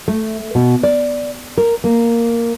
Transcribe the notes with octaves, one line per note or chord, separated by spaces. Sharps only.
A3
B2
D5
A#4
A#3